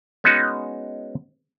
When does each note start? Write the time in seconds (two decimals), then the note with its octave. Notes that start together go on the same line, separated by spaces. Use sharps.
0.24 G#3 B3 C#4 D#4 F#4